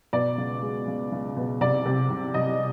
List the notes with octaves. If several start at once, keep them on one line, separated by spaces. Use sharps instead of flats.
B2 D5
C#2
G#3
C#2
C#2
B2
C2 D5
C3
C2
C2 D#5